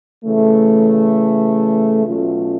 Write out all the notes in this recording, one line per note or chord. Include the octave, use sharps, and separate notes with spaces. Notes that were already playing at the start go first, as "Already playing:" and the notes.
C#3 E3 A3
B2 F#3 A3 C#4 F4